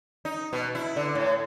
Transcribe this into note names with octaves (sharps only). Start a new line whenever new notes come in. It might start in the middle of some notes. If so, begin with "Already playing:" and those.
D#4
B2
E4
D3
A2